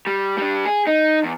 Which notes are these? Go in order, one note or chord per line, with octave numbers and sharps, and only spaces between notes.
G3
G3 D4
G#4
D#4
E2